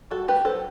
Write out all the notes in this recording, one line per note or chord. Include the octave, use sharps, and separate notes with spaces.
G3 F#4 A4
A3 G4 B4
F#3 A4 C5